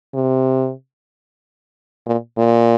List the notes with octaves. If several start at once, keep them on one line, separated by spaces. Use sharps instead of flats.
C3
A#2
A#2